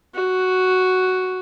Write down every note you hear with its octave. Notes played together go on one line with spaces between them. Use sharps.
F#4